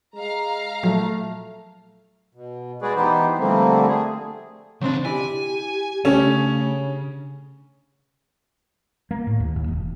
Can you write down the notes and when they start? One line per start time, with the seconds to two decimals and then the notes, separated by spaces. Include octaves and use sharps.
0.15 G#3 F5 A#5
0.83 A#2 F3 F#3 A3
2.35 B2
2.82 G#3 F#4 G#4 B4 D5
2.96 E3 B3 D#4 G4 B4 C5
3.38 D3 F3 G3 A3 A#3 C4
3.87 A3 G#4
4.82 B1 C#3 E3 C4 D4
5.05 E4 G4 D5 G#5
6.05 C#3 A3 C#4 D4 G4 A4
9.11 A#3
9.27 A2
9.40 D#2
9.56 D#2
9.68 E1